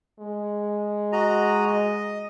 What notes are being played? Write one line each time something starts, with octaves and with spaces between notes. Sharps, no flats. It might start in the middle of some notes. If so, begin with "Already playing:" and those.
G#3
F#4 D#5 A#5
D#5